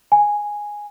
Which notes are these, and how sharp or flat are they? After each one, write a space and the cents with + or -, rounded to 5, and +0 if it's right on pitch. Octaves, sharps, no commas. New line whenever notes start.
G#5 -5